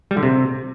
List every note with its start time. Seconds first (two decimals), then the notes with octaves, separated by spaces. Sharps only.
0.11 G3
0.17 D3
0.23 C3